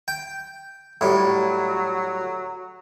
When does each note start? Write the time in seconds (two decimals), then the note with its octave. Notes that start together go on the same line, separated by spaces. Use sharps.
0.08 G5
1.01 A2 F#3 G3